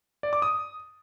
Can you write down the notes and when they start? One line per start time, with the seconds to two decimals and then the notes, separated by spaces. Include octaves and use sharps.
0.23 D5
0.33 D6
0.42 D#6